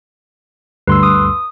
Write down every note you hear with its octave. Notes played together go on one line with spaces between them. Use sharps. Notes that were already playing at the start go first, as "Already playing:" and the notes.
D2 G2 D3 B4 C6 E6
D#6